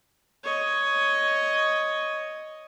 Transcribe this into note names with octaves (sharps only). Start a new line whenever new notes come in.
C#5 D#5